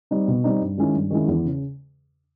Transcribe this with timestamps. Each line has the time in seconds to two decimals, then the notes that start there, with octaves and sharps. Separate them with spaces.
0.11 G3 C4 D#4
0.28 B2
0.44 G3 C4 D#4
0.61 G2
0.78 D#3 G#3 C#4 E4
0.94 G2
1.11 D#3 G#3 C#4 E4
1.28 E2
1.45 C#3